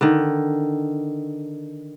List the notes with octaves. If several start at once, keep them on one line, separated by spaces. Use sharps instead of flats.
D3 D#3